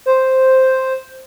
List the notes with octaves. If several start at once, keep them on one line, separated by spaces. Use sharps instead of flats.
C5